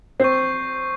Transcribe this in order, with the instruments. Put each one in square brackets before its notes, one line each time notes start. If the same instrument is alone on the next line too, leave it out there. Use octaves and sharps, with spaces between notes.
[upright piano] C4 [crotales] C#6 G6 C7